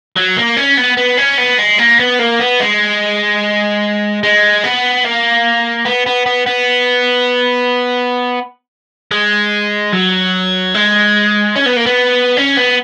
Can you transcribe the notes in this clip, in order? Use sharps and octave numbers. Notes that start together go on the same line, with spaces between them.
F#3
A#3
C#4
B3
B3
C#4
B3
G#3
A#3
B3
A#3
B3
G#3
G#3
B3
A#3
B3
B3
B3
B3
G#3
F#3
G#3
C#4
B3
A#3
B3
C#4
B3